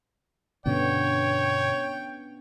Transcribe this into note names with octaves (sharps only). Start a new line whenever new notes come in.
G2 B2 D3 B3 C#4 D4 C#5 G5